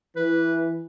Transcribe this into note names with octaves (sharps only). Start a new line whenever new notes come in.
E3 B4